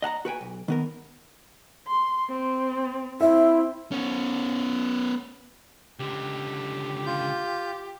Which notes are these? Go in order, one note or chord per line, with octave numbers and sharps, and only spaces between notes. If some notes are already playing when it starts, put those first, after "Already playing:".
D#5 F#5 A5 A#5
F#4 B4 G5 G#5
B1
D#3 B3 A#4
C6
C4
C4 E4 E5
B3 C#4
C#2 D3 G4
F4 G6